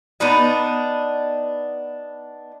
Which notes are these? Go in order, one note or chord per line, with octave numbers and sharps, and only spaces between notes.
B3 D4 D#4 D#5